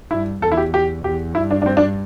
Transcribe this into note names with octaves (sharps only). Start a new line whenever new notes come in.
G2 E4
E2 A4
E4
G4
G4
E2 G4
G2 E4
D4
D4
C4
D4